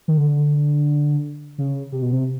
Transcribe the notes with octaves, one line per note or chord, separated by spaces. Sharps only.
D#3
D3
C#3
C3
B2
C3